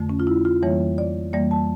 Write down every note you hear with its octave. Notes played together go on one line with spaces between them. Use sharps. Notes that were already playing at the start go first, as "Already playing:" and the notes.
Already playing: F2 D3 A3
C#4
F4
E4
F4
F2 E3 G3 A#3 C#5
D5
F2 E3 G3 A#3 D5
A5